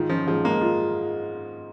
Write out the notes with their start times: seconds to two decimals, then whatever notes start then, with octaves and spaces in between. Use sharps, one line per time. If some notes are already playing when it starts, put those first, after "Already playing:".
Already playing: G#2 D#3 G#3 F4
0.09 F3 C#4
0.27 G#2 F3
0.44 G#3 A#3
0.61 F4